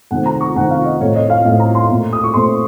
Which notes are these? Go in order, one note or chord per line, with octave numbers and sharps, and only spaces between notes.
C3 D#3 A3 C4 F#5
A#5
C#6
C3 D#3 A3 C4 F#5
F5
D#5
A2 A3 C4 C#5
D#5
F5
A2 A3 C4 F5
A#5
C6
A#2 A3 C4
D#6
C#6
A#2 A3 C4 C6